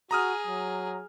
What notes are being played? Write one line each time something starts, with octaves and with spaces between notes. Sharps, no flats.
F#4 G#4 A#5 D#6 F6
F#3